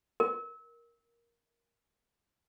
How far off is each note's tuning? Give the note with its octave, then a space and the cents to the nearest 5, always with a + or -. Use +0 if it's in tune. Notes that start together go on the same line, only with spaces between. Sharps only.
A#4 +5